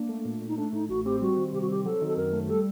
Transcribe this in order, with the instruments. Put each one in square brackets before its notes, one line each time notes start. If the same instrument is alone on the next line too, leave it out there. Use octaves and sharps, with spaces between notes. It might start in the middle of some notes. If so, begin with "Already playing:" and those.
Already playing: [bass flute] A#3 [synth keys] D4
[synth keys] A3
A#2
A#2
[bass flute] D#4
[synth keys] A3 [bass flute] D4
[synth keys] A2 [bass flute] D#4
[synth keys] A1 [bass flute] F#4
[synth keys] C4 [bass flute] G4
[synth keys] G3 [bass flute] F#4
[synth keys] D#3
[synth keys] C3 [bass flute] G4
[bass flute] F#4
[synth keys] C4 [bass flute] G4
[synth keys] F#3 [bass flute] A4
[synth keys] D#3
[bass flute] A4
[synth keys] F#2 [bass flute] A#4
[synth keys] A3
[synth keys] G3 [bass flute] A4